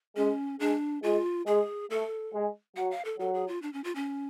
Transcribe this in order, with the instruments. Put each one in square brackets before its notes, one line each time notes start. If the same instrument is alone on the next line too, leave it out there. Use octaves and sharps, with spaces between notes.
[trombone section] G#3 [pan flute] C#4
[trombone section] G#3 [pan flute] D4
[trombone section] G#3 [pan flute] F4
[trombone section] G#3 [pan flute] G#4
[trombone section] A3 [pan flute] A4
[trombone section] G#3
[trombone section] F#3 [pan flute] F#5
[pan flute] F5
A4
[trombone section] F#3 [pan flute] A4
[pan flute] G#4
F4
D4
C#4
F4
C#4